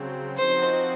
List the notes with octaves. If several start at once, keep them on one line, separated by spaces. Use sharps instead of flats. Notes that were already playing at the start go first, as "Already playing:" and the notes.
Already playing: C#3 F#3 C4
F3 C4 D#4 F#4 C5